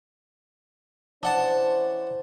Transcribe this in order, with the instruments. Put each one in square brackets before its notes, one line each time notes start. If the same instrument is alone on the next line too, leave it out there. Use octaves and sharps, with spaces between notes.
[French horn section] E3 C#4 C5 [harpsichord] D4 F#5 A5